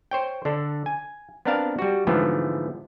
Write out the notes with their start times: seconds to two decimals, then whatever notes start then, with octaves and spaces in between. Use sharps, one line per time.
0.11 C5 C#5 G5
0.45 D3 D4 A4
0.86 G#5
1.45 B3 C4 D4 A#4 F5 A5
1.79 G3 F#4
2.07 G#2 D3 E3 F3 A3 B3